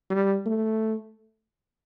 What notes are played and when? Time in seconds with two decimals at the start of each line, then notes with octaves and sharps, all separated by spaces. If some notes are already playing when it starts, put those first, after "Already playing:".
0.10 G3
0.46 A3